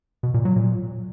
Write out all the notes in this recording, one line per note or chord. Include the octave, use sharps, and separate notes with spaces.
B2
A#2
F#3
A#2